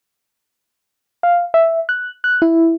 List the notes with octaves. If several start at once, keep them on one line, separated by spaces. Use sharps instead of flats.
F5
E5
F#6
F#6
E4